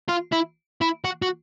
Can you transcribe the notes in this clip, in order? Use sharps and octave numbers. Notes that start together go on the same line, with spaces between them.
F4
E4
E4
F#4
F#4